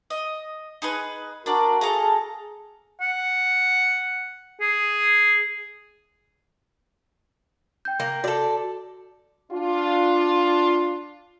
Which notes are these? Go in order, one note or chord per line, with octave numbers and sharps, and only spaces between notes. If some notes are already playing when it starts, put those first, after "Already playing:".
D#5
D#4 G#4 B4
D4 F#4 A#4 D5
G#4 A4 F5 A#5
F#5
G#4
G5 G6
A#3
F#4 A4 D5
D4 F4